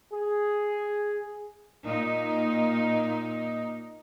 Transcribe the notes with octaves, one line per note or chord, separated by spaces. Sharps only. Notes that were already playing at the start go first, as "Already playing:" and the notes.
G#4
A#2 D#4